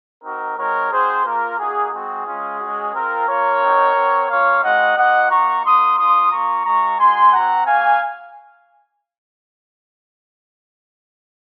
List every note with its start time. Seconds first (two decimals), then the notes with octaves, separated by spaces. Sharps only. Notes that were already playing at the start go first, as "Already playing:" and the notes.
0.23 C4 D#4 F#4 A#4
0.57 G#3 C4 D#4 F#4 A#4 C#5
0.91 C4 D#4 F#4 G#4 C5
1.25 A#3 F4 A#4
1.59 A#3 D#4 F#4 G#4
1.92 G#3 C4 F#4 G#4
2.26 G#3 C#4 F4
2.60 G#3 C#4 F#4
2.94 C4 F4 A#4
3.28 A#3 F4 A#4 C#5
3.62 C4 D#4 F#4
3.95 C4 F#4
4.29 A#3 C#4 F4 C#5 F5
4.63 G#3 C4 D#4 F#4 D#5 F#5
4.97 A#3 F4 D#5 F#5
5.30 A#3 D#4 F#4 A#5 C#6
5.64 A#3 D#4 F#4 C6 D#6
5.98 A#3 C#4 F4 C6 D#6
6.31 A#3 F4 A#5 C#6
6.66 G#3 C4 F4 A#5 C#6
6.99 G#3 D#4 F#4 G#5 C6
7.33 C4 F#4 F#5 A#5
7.67 A#3 C#4 F#4 F5 G#5